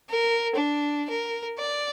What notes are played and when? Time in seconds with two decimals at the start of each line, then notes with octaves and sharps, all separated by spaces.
0.10 A#4
0.55 D4
1.10 A#4
1.58 D5